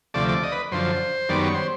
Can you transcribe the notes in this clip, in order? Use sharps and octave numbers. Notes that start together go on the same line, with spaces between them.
D2 C3 F3 A3 D5
D5
D#5
B4
F#2 D3 F3 C5
F#2 D#3 G3 B3 D5
C#5
C5